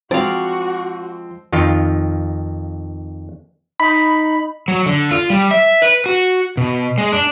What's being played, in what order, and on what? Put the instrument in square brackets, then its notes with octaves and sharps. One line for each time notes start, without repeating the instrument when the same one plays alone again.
[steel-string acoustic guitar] F3 G#3 [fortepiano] C4 [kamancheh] F#4 [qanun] D5 F5
[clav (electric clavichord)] F2 D#3 F4
[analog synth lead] D#4 [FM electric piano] B5
[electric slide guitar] F#3
D3
F4
G3
E5
B4
F#4
B2
G#3
D4